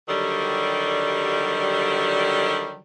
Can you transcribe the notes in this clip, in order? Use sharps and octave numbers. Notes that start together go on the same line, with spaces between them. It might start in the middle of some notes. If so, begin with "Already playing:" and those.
D3 D#3 F#3 G3